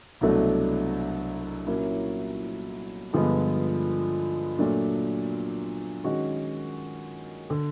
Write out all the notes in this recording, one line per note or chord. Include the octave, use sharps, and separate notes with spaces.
C2 B2 F#3 A3 D4
A#2 F#3 A#3 C#4 E4
G2 D3 F3 G#3 B3
A#2 F#3 A3 D4
D#3 G#3 C#4 F#4
D3